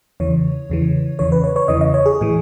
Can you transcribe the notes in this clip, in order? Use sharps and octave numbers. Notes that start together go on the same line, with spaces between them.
E2 C#3 E3 C#5
E2 C#3 E3
E2 C#3 E3 C#5
B4
C#5
C#5
E2 C#3 E3 D#5
D#5
C#5
G#4
A2 E3